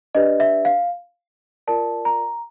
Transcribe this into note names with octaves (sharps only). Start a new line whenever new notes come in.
D4 G4 B4 D5 D#5
E5
F5
F4 A#4 D5 A5
A#5